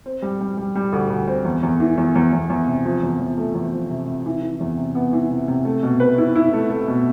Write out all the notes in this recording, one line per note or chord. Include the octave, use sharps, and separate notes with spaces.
C4
G3
G3
G3
G3
D2
D2
C4
E2
E2
E3
E2
E2
E2
E2
C3
F3
E2
E2
A3
E2
F3
C3
C3
E3
E3
E2
C3
B3
E3
C3
C3
A3
B2
B4
E4
E4
A3
A3
B2